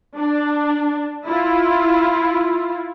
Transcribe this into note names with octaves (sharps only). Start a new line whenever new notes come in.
D4
E4 F4